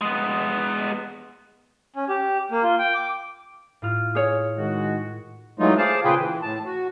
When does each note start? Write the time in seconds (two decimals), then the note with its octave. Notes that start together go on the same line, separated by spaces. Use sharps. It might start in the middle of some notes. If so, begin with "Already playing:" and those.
0.01 G#3 B3
1.95 C#4
2.09 G4
2.51 A#3
2.63 F4
2.79 G5
2.94 D6
3.82 A2 F4 F6
4.15 G#4 C#5
4.58 D#3 G#3 F#4
5.59 E3 F#3 G#3 A3 D#4 F4
5.78 G#4 C5 D5 F5 A5
6.04 A#2 C#3 F4 G#4 B4 G5
6.19 E3
6.42 A2 A5
6.65 F#4